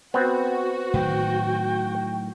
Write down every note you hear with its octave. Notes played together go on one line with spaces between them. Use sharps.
B3 C4 F#4
A2 D#3 F#3 G5